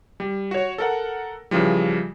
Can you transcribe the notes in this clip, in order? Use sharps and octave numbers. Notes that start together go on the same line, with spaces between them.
G3
F#4 C#5
A4 A#4 F#5
C#3 E3 F3 G3